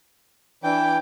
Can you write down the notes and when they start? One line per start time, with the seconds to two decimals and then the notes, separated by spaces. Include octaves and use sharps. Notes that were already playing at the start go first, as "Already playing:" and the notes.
0.64 E3 D4 B4 G5 D6